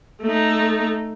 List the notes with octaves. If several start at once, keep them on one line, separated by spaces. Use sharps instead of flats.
A3 D#4